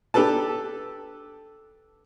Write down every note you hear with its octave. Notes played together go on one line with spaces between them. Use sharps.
D4 G4 A4 B4 A5